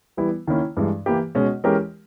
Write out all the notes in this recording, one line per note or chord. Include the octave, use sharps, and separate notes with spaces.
E3 G3 B3 E4
D#3 A#3 C#4 E4
G2 E3 G#3
E3 A#3 E4 G4
B2 G#3 C#4
E3 G#3 C#4 G4 A#4